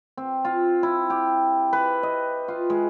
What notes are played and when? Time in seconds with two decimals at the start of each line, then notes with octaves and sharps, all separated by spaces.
0.17 C4
0.45 F4
0.83 E4
1.10 G4
1.73 B4
2.03 D#5
2.48 F4
2.70 G#3